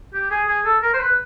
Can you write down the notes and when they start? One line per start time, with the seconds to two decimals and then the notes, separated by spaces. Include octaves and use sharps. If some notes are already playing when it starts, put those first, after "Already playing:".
0.14 G4
0.31 G#4
0.48 G#4
0.65 A4
0.82 A#4
0.94 C5
1.00 B4